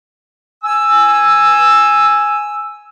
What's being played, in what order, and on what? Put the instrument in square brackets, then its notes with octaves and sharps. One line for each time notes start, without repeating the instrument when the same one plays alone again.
[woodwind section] G#5 E6